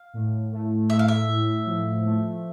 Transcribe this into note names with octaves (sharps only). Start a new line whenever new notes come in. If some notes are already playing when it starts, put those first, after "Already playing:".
Already playing: F5
A2
A3
A2 E5
F5
E5
A2
F3
A3